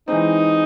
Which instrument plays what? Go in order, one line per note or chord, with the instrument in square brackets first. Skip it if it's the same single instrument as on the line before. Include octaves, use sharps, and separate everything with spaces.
[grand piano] E3 G#3 C4 [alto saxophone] D#4